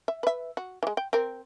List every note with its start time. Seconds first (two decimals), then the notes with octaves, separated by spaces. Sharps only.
0.08 E5
0.23 B4 E5
0.57 F#4
0.83 E3 G#3
0.97 G5
1.13 C4 A#4